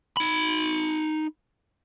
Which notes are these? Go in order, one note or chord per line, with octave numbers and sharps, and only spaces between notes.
D#4 B5